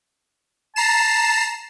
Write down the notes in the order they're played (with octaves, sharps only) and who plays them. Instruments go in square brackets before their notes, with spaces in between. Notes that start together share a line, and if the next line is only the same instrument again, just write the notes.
[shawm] A5 [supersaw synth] A#5 C7 E7